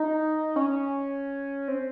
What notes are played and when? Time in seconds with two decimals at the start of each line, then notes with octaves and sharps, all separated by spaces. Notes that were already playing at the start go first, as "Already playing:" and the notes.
Already playing: D#4
0.56 C#4
1.68 C4